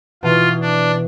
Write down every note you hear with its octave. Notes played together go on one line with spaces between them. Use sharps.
B2 E3 F4
D4